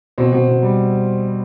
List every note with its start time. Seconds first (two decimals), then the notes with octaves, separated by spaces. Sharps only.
0.18 B2 C4 C5
0.32 B2
0.48 B2
0.63 G3